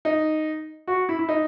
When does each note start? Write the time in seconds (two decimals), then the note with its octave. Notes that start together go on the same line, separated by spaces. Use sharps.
0.05 D#4
0.88 F#4
1.09 E4
1.19 E4
1.29 D#4